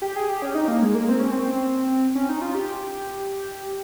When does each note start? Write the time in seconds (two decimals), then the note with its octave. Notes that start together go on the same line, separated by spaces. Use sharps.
0.02 G4
0.16 G#4
0.29 G4
0.42 C#4
0.55 D#4
0.68 A#3
0.82 G#3
0.95 A#3
1.09 C4
1.19 C#4
1.31 C4
2.15 C#4
2.29 D#4
2.42 F4
2.55 G4